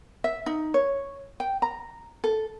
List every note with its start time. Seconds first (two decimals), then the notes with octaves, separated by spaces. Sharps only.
0.24 E5
0.46 D#4
0.74 C#5
1.40 G5
1.62 A#5
2.24 A4